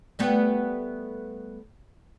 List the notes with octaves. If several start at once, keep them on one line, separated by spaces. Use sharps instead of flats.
G3 A3 B3